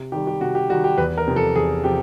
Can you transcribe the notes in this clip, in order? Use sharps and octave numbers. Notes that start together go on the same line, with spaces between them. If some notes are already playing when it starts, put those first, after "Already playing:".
Already playing: C3
D#3 G3 G4
G4
C3 F#4
G4
D#3 G3 F#4
G4
E2 B4
A#4
C3 F3
A4
E2 G#4
C3 F3 G4